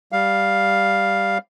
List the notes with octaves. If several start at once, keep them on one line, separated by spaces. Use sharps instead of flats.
G3 F5